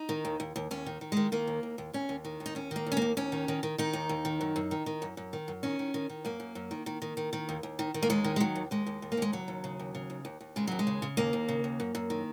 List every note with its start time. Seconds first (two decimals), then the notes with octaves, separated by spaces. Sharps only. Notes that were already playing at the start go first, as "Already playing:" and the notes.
Already playing: D#4
0.09 D#3
0.25 D#2
0.40 D#2
0.56 D#2
0.71 D#2 C#4
0.86 D#3
1.01 D#3
1.12 D#3 G#3
1.32 D#3 A#3
1.47 D#2
1.63 D#2
1.78 D#2
1.93 D#2 C#4
2.09 D#2
2.25 D#3
2.40 D#2
2.46 D#4
2.55 D#2 C#4
2.71 D#3 A#3
2.86 D#2
2.92 C#4
2.97 D#2 A#3
3.17 D#2 C#4
3.32 D#3
3.48 D#3
3.63 D#3
3.78 D#3 D#4
3.93 D#2
4.09 D#2
4.25 D#3
4.41 F#2
4.56 F#2
4.71 D#3
4.86 D#3
5.02 F#2
5.17 F#2
5.33 D#3
5.48 F#2
5.63 D#3 C#4
5.79 D#3
5.94 D#3
6.10 D#3
6.25 F#2 A#3
6.40 F#2
6.55 F#2
6.71 D#3
6.86 D#3
7.02 D#3
7.17 D#3
7.33 D#3
7.49 D#2
7.63 D#2
7.79 D#3
7.94 D#3
8.03 A#3
8.10 D#2 G#3
8.24 D#3
8.36 G#3
8.40 D#3 F#3
8.56 D#2
8.71 D#2 G#3
8.87 D#2
9.02 D#2
9.12 A#3
9.17 D#2 G#3
9.33 C#3 F#3
9.48 D#2
9.64 C#3
9.79 D#2
9.95 C#3
10.10 D#2
10.25 D#2
10.41 D#2
10.56 C#3 G#3
10.67 D#2 F#3
10.79 G#3
10.87 C#3
11.02 C#3
11.17 D#2 A#3
11.33 D#2
11.48 C#3
11.64 D#2
11.80 F#2
11.95 F#2
12.10 D#3